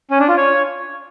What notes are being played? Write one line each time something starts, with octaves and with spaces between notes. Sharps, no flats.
C#4
D4
F4
C#5